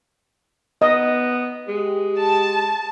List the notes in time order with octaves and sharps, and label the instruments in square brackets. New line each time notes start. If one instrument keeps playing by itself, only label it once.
[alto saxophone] B3 [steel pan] D#5
[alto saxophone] G#3 [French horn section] G4
[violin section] A5